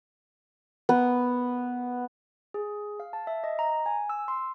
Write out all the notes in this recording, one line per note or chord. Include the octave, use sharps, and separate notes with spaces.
B3
G#4
F5
A5
E5
D#5
A#5
G#5
E6
C6